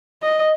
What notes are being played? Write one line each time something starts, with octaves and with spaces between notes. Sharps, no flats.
D#5